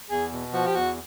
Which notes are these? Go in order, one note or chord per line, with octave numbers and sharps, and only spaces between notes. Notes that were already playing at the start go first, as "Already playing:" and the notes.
E2 G#4
B2
F3 F#4
G4
E2 F#4